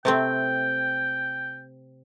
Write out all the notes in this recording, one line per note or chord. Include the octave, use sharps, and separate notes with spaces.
C3 A3 C4 G5